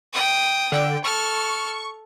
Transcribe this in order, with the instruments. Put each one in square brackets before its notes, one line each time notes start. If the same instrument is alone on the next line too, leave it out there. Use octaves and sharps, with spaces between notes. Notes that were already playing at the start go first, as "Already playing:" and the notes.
[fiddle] G5 D#6
[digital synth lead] D3 [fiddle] G5
[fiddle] A4 F6 [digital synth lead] C#6